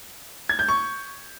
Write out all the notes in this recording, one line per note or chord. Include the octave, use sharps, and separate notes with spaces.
G#6
G6
C#6